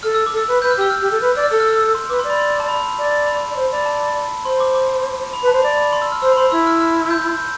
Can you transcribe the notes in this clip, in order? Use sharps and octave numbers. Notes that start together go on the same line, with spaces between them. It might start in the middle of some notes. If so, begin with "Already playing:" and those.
A4 F6
E6
D6
A4 E6
B4
B4 G6
F6
G4 E6
F6
G4
A4
B4 F6
D5 E6
F6
A4 E6
F6
E6
E6
C6
B4 D6
D5 C6
B5
C6
A5
B5
D5
B5
D5
C5
D5 B5
A5
B5
C5 C6
D6
D6
B5
B4
A5
C5
D5 B5
B5
C6
E6
F6
C5 E6
B5
C5 C6
E4 E6
F6
F6
G6
G6